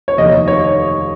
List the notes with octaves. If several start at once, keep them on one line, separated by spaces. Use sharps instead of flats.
C#5
F1 D#2 D#3 D#5
C#5